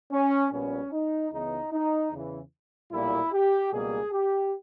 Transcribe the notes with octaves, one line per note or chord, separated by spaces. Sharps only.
C#4
A#1 A#2 G3 B3 C#4
D#4
C#2 C#3 E3 G#3 B3 D#4
D#4
E2 C#3 E3
B1 A#2 G3 A#3 E4
G4
C#2 B2 G3 A#3 G#4
G4